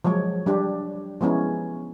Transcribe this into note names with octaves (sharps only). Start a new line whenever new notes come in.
F3 F#3 G#3 C#5
G3 D4 G4
F3 G#3 B3 C#4 E4